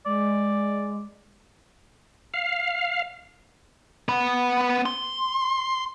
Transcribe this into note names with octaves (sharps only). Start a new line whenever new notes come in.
G#3 D5
F5
B3 B5
C6